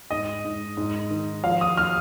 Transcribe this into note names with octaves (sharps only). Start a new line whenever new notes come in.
G#2 D#5
G#2
G#2
D#3
F3 F5
D#6
F6